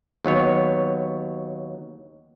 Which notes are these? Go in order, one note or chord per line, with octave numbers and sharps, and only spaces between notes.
D#2 F#3 B3 C#5